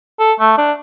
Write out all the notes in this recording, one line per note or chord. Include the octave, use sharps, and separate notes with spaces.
A4
A3
D4